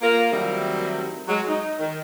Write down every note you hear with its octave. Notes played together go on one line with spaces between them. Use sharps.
A#3 F4 A#4
D#3 F#3 G3 A3 C4 E4
F#3 G#3
D#4
D#3